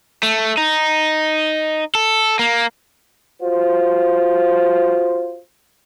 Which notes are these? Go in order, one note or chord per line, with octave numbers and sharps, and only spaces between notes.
A3
D#4
A4
A#3
F4 F#4 C5